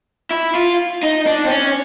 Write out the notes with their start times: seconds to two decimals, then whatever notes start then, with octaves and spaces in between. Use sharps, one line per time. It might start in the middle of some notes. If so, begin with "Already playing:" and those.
0.31 E4
0.55 F4
1.03 D#4
1.26 D4
1.46 C4
1.50 C#4